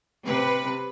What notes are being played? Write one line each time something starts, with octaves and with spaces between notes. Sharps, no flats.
C3 B4